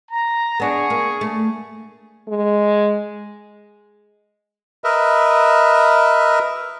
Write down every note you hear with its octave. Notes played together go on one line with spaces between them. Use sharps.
A#5
B3 D4 G#4 C#6
A#3
A3
G#3
A#4 B4 D#5 E5